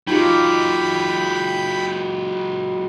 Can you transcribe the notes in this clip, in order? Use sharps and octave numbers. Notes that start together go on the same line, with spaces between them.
F#3 G#3 D#4 F4 G4 G5 B5